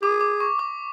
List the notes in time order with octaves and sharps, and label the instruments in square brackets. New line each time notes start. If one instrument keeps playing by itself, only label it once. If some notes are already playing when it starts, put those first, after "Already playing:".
[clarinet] G#4 [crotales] D6
[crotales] D6
C#6
D6